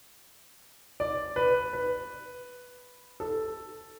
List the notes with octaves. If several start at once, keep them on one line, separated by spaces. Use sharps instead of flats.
D5
B4
B4
A4